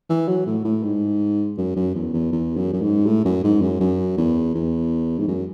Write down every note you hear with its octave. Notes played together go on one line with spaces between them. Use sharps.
E3
F#3
A2
A2
G#2
F#2
F#2
E2
E2
E2
F#2
F#2
G#2
A2
F#2
G#2
F#2
F#2
E2
E2
G#2
F#2